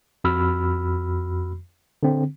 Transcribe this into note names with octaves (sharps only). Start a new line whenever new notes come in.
F2 F#4 B5 E6 F6
D3 C4